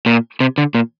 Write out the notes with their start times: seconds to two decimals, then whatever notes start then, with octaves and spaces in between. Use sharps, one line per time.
0.06 A#2
0.40 C3
0.58 D3
0.75 A#2